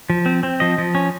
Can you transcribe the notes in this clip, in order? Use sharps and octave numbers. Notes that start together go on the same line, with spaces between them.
F3
C4
C4
F3 D#5
F3
C#4